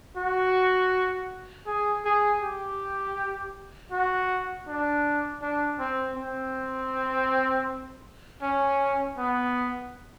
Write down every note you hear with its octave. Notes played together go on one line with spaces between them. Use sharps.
F#4
G#4
G#4
G4
F#4
D4
D4
C4
C4
C#4
B3